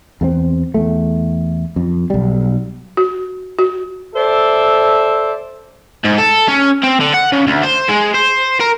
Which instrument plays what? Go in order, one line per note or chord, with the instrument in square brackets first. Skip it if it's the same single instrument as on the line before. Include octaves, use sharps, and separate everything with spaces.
[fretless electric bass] E2 A3 C4
E2 A3
F2
B1 G3
[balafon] F#4
F#4
[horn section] A4 C5 D5 E5
[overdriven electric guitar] G#2
A4
C#4
C4
D3
F#5
C#3
D2
C5
G#3
C5
A#4